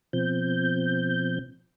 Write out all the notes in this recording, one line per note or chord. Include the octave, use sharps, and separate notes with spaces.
B2 F3 C4 G6